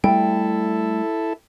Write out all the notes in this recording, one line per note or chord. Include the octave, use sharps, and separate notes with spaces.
G3 A3 E4 A4 G5